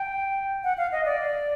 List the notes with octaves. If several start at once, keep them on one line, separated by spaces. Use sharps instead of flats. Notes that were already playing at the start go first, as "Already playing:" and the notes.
Already playing: G5
F#5
F5
D#5
D5